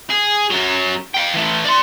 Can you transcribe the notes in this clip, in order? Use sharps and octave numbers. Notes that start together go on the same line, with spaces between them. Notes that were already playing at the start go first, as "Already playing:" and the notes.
G#4
F#2 F#3
F5 G5
E3 A3
D5 C6